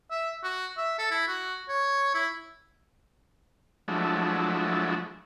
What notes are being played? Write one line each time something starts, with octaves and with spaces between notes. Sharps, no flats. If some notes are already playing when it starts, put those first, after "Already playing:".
E5
F#4
E5
A4
E4
F#4
C#5
E4
F3 F#3 G#3 A3 D4 E4